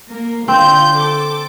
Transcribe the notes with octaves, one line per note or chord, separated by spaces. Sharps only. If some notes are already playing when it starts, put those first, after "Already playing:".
A#3 A#4
D3 C4 F4 G6
A4 D6